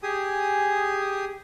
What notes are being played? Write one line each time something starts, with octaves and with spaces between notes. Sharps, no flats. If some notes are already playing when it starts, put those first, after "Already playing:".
G4 G#4 G#5 D#6